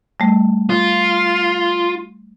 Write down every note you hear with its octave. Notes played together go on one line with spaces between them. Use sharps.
G3 A3
F4